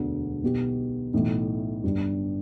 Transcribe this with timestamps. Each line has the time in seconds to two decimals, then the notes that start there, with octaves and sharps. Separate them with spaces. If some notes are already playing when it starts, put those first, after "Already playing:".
Already playing: E1 D2 D3 B3
0.43 B1 B2 B3 G4
1.14 B1 A2 E3 A3
1.83 G1 G2 G3